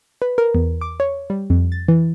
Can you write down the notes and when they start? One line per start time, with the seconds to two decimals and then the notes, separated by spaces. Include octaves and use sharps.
0.22 B4
0.38 A#4
0.55 E2
0.81 D6
1.00 C#5
1.30 G3
1.50 F2
1.72 A6
1.88 E3